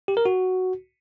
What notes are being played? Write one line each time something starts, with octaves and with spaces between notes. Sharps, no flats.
G4
A#4
F#4